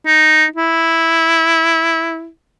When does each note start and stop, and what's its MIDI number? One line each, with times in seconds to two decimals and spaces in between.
0.06 0.45 63
0.56 2.28 64